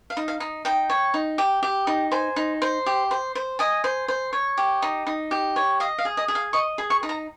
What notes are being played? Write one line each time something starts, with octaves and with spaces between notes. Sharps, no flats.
F5
D#4
F5
D#4
D#4 G5
C#5
D#4
G4
G4
D#4
C5 G#5
D#4
C5
G4
C5
C5
D#5 G#5
C5
C5
C#5
G4
D#4
D#4
G4
C#5
D#5 F5
F5
G#4
D#5
G#4
F5
D#5 C#6
G#4
C#6
D#4
A#5